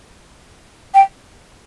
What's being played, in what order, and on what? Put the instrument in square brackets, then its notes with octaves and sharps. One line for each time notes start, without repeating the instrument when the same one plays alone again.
[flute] G5